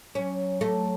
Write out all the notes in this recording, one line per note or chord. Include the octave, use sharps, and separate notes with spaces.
F#3 C#4
A3